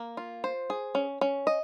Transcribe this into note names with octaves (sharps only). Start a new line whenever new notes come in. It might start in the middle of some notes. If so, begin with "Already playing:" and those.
Already playing: A#3
F4
C5
G#4
C#4
C#4
D#5